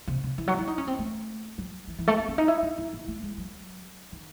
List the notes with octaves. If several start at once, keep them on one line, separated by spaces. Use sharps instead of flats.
C3
C#3
E3
F#3
E4
D#4
C#4
C4
A3
F#3
E3
E3
A3
C4
C#4
D#4
E4
D#4
E4
E4
A3
G#3
F#3
D#3